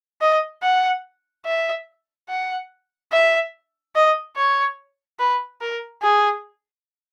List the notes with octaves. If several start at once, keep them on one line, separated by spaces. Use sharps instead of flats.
D#5
F#5
E5
F#5
E5
D#5
C#5
B4
A#4
G#4